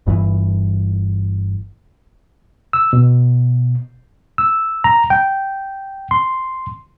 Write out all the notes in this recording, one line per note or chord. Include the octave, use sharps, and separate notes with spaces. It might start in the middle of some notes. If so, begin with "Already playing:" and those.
G1 G2 D3 E3
E6
B2
E6
A#5
G5
C6